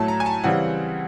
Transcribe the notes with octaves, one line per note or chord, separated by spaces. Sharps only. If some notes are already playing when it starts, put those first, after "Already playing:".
Already playing: A2 F#3 A3 A5
A#5
G#5
A5
C#3 E3 G3 C4 F#5